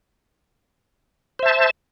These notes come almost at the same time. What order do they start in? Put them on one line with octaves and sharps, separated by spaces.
C5 E5 A5